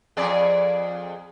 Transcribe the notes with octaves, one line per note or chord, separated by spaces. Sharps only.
F2 G#4 D5